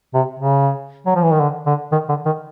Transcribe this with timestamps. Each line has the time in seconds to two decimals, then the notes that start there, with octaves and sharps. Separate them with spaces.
0.14 C3
0.39 C#3
1.06 F#3
1.15 F3
1.23 E3
1.33 D#3
1.40 D3
1.66 D3
1.92 D#3
2.09 D3
2.26 D#3